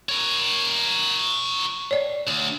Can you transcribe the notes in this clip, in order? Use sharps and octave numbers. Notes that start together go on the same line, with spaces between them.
A#4 C#5
C#5 D5
D2